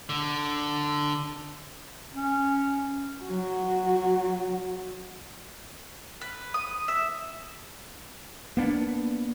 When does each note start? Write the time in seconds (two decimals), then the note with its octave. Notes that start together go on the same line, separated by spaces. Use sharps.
0.09 D3
2.14 C#4
3.23 F#3 F#4
6.21 B4
6.54 D#6
6.88 E5
8.57 A#3 B3 D4